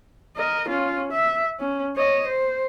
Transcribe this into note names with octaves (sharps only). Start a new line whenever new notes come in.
A#4 D#5
C#4 F4
E5
C#4
C#5 D#5
C5